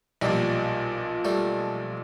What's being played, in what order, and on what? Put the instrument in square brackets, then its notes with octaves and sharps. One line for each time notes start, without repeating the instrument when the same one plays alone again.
[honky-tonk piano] B1 A#2 F3 [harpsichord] G3
[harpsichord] G3 A3